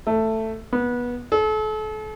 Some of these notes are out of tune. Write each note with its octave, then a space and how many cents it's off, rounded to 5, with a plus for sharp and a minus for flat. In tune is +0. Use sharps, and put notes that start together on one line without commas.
A3 +10
B3 -20
A4 -35